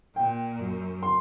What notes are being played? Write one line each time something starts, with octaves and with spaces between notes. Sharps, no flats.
A#2 G5
F#2
C6